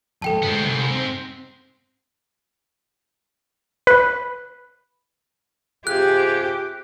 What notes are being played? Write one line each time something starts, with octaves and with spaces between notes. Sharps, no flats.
F2 G#2 A4 G5 A5
D2 G#3 B3 C4
C2 G#2
C4
B4
C3 F4 G4 G#4 F#6